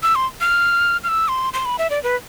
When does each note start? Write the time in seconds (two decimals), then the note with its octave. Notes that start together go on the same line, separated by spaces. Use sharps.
0.03 E6
0.15 C6
0.41 F6
1.04 F6
1.09 E6
1.28 C6
1.53 C6
1.65 B5
1.79 E5
1.90 D5
2.03 B4